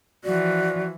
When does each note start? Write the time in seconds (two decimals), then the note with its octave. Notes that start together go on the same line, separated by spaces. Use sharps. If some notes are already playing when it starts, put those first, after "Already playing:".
0.24 E3 F3 F#4 D5